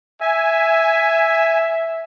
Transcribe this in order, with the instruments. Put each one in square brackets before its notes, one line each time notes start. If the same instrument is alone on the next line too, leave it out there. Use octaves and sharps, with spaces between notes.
[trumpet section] E5 [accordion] G#5